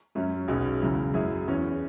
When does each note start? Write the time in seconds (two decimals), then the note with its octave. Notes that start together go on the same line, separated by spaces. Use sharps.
0.15 F#2 F#3 C#4
0.48 B1 B2 G#3 C#4
0.82 E2 C#3 F#3 E4
1.14 F#2 F#3 E4 G#4
1.48 E2 E3 C#4 G#4